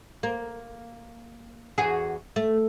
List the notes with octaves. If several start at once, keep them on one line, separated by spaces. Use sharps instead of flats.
A#3
E2 F#4 G#4
A3